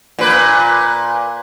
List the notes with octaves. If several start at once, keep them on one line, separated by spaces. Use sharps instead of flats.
A#2 B4